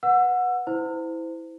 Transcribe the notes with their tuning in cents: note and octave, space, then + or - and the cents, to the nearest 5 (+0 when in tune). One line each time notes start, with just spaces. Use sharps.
B4 +0 F#5 -20 E6 +25
E4 -15 C5 -30